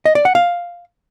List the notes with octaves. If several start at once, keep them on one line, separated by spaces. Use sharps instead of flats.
D#5
D5
F#5
F5